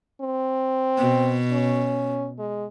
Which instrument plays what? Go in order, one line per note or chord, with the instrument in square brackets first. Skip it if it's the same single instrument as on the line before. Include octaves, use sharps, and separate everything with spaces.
[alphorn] C4
[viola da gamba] B2
[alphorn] C#4
G#3